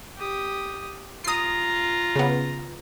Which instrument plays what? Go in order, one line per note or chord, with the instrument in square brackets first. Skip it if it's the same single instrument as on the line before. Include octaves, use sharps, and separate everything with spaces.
[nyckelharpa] G4 D#6
[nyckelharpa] F4 A#5 [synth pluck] D#6 C7
[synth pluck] C#3 B3